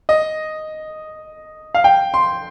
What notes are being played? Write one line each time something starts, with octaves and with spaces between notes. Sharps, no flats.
D#5
F5
G5
C6